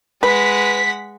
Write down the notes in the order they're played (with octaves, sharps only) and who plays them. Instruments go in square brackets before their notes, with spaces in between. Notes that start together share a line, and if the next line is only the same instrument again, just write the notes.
[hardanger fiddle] G#3 F#5 [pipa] B4 [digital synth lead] B6